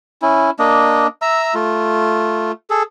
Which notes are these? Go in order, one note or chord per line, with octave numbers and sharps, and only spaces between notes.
C#4 E4
A#3 D4 D#5
E5 A#5 E6
A3 F4
G#4 A4